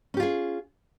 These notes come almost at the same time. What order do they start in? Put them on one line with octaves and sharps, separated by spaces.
C#4 G4 F4 G#4